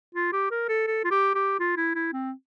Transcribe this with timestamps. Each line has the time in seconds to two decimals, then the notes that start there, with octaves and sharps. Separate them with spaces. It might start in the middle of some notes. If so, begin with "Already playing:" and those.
0.15 F4
0.33 G4
0.51 A#4
0.68 A4
0.87 A4
1.04 F4
1.11 G4
1.35 G4
1.59 F4
1.77 E4
1.95 E4
2.13 C4